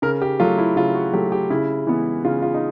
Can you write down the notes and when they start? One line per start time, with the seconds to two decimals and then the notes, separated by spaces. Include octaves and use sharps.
0.02 C#3 A#4
0.22 G4
0.39 F#3 A3 F4
0.58 E4
0.76 C#3 F4
0.95 F#4
1.13 F#3 A3 G4
1.32 G4
1.50 C#3 E4
1.87 E3 G#3 B3
2.24 C#3 F4
2.42 F4
2.54 D#4